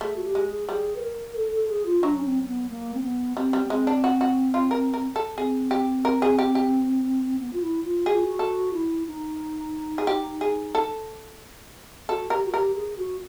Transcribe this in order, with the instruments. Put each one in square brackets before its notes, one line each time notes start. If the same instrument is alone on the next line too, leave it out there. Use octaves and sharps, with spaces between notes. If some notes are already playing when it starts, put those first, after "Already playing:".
[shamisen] A3 [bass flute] G#4
[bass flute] F#4
G4
[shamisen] G#3
[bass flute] G#4
[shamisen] G3 [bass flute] G#4
[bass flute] B4
A#4
A4
A4
G#4
F4
[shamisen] F#3 [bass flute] D4
[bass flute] C#4
C4
C4
B3
A#3
C4
B3
[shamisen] G3 [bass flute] C4
[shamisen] G3
[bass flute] B3
[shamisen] G#3 [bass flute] C4
[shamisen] D4
F#4
F#4
F4
A#4
A#4
A4
[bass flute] C4 [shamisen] G#4
[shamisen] G4
A#4
G#4
G4
G4
[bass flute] B3
F4
E4
F4
[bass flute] F#4 [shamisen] G#4
[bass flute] F4
F#4
[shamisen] A4
[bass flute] E4
D#4
[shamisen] G#4
G4
G#4
A4
[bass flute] F#4 [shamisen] A4
[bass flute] G4 [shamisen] A#4
[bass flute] F#4
[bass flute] G4 [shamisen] A#4
[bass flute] G#4
F#4